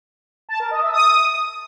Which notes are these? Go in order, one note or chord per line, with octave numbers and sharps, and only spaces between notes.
A5
A#4
D#5
E5
D#6